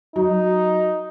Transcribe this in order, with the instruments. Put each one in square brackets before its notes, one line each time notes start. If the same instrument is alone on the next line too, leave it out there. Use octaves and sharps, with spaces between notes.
[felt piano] F#3 [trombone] D#4